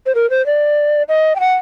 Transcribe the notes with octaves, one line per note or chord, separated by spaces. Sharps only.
C5
A#4
C5
D5
D#5
G5
F#5